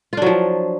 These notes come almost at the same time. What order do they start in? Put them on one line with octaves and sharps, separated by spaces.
F4 D4 F#3 F3